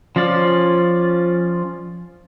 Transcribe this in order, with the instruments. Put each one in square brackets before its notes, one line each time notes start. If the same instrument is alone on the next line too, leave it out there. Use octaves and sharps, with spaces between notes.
[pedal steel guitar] F3 C#4 F4 D5